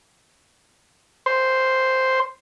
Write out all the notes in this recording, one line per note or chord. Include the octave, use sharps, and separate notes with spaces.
C5